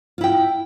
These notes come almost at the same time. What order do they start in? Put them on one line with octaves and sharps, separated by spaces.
F4 E4 G5